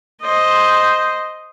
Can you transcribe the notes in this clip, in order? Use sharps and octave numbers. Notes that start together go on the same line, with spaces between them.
C5 D#5